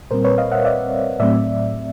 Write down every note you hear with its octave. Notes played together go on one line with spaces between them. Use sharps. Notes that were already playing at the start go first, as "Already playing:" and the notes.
A#2 G3 C4 A#4 C5
B4 C#5
D#5 F5
E5 F#5
D5 E5
A2 F#3 A3 C4 D5 E5